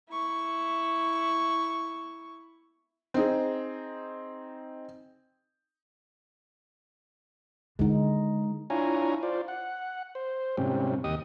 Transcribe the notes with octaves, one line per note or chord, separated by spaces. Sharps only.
E4 C#6
C4 D#4 G#4
D3 G#3 D4 D#4
D4 E4 F4 C#5 G#5 A#5
F4 C5 D5
F#5
C5
G#2 C3 G3 C4 C#4
D#2 G4 D#5 D#6